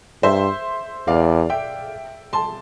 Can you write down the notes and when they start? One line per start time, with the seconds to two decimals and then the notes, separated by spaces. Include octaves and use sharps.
0.23 G2 C5 E5
1.07 E2 D5 F5
1.50 E5 G5
2.33 A5 C6